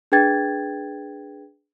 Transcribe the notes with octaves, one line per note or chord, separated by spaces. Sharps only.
D4 G#4 B4 G5 G#6 A6